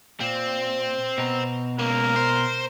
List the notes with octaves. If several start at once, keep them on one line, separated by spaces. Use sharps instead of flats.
A#2 C4
B2 A#5
C#2 A#3 A#4
C5